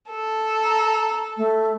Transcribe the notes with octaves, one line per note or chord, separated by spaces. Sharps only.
A4
A#5
A3